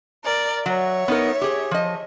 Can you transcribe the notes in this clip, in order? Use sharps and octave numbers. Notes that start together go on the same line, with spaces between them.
A#4 D5
F#3 C#5 E5
B3 D#4 A#4
G4 G#4
F3 D#5